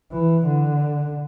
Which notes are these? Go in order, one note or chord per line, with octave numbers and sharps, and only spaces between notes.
E3
D3